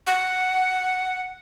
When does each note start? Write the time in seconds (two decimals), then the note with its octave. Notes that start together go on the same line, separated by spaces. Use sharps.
0.07 F#5